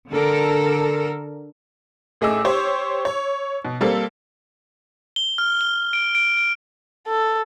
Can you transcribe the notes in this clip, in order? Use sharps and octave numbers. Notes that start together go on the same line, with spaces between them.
D3 A4 A#4
A1 A3 G#4 D#5 D6 E6
G4 C5 C#5
C#5
B2
G3 A#3 C4 A4
G7
F6
G7
D7
D7
D7
A4